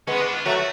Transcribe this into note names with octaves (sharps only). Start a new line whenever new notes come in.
G#3 B3 C#4
D4
F4
F#3 A3 F#4